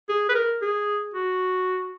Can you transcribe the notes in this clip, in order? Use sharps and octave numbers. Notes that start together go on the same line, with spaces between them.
G#4
B4
A#4
G#4
F#4